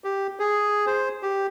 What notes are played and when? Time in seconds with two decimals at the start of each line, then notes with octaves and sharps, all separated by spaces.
0.04 G4
0.39 G#4
0.87 C5
1.23 G4